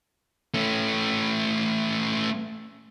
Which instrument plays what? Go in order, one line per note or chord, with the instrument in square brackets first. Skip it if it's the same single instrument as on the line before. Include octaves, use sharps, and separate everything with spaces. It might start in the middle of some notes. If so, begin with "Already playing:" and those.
[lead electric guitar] A3 C#4